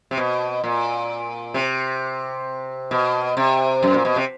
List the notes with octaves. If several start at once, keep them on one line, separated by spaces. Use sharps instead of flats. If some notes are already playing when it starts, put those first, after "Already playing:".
C3
B2
A#2
C3
B2
C3
F#2
A#2
B2
C3